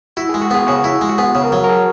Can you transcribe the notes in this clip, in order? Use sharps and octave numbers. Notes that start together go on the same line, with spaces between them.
E4 F#4
G#4
G#3
F#4
B3 G#4
C#3 F#4
E4
G#3
F#4
B3 G#4
C#3
A#4
F#3
A#4
G#4